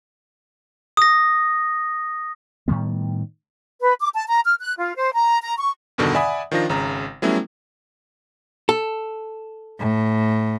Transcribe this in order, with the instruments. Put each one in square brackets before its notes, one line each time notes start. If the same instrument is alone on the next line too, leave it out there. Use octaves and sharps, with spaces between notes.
[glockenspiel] D#6 A#6
[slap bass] A2 D#3 G3 B3
[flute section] B4
D6
A5
A#5
F6
F#6
F4
C5
A#5
A#5
C#6
[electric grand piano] E2 G2 B2 D3 D#3
D5 E5 F#5 G#5 B5 D#6
D#3 F3 D4 F4 A#6
G#1 C#3 A#5
F#3 G3 A3 B3 C#4 E4
[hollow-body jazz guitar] A4
[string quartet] A2